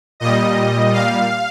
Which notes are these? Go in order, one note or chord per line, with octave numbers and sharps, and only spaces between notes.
A#2 G3 D#5
F5